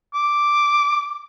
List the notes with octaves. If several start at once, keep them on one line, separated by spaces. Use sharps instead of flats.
D6